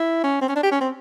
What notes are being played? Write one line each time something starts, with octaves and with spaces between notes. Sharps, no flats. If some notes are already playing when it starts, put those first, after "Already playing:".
Already playing: E4
C#4
C4
C#4
D4
G4
C#4
C4